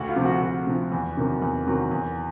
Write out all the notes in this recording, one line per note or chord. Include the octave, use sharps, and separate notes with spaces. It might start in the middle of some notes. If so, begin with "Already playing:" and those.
Already playing: D2 F#4
F4
C3 F3
F#4
D2 F#4
C3 F3
E2
C3 D#3 F#3
E2
C3 D#3 F#3
E2